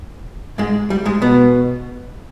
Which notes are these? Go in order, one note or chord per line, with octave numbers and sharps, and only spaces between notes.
G#2 G#3
G3
G#2 G#3
B2 B3